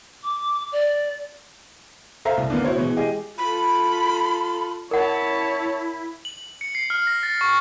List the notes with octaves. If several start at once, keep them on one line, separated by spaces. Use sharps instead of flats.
D6
D5
A4 C5 E5 F5 A#5
C2
D3 A#3 B3 D4
E4 F#4 C5 C#5
B2 E3 G#3
G#3 G4 G#4 D#5
F4 A4 B5
E4 A#4 C#5 F#5 A5
F#7
C#7
C7
F6
A#6
A6
C#6